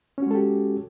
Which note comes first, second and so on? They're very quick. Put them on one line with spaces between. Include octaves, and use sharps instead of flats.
C#4 F#4 G#3 A4 G4